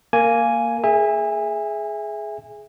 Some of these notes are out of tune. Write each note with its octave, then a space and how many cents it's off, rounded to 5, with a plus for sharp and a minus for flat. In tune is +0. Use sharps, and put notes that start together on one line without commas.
A#3 -10 G#5 +0
G#4 +15 E5 +0 G#5 -30